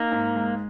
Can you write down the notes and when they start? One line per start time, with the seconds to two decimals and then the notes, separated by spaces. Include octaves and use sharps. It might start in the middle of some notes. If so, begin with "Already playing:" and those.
Already playing: A#3 D#4
0.12 G#2
0.36 G#3